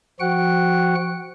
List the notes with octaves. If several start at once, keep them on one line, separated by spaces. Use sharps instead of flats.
F3 F#4 F#5 G5 F#6